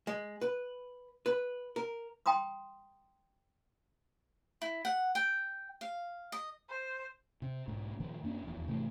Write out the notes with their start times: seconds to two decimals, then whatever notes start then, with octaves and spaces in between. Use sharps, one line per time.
0.07 G#3
0.41 B4
1.26 B4
1.76 A#4
2.26 G5 A#5 C6 D#6
4.62 E4
4.85 F#5
5.15 G5
5.81 F5
6.32 D#5
6.69 C5
7.42 C3
7.68 B1 G#2
8.00 A#2 D#3 F3
8.23 F#2 A#3 C4 D4
8.44 D#1 A#1 E2
8.67 G#1 C3 E3 A3